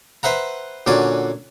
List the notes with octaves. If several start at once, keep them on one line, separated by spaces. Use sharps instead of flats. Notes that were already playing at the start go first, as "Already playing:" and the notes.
B4 C5 E5 F#5 A#5
A#2 D3 C#4 F#4 D5 G#5